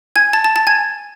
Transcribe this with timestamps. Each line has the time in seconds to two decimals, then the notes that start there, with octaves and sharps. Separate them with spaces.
0.16 G#5 G#6
0.33 A5 A6
0.44 A5 A6
0.56 A5 A6
0.67 G#5 G#6